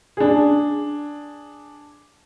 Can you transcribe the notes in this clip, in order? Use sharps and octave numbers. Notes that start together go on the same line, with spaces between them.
D4 G#4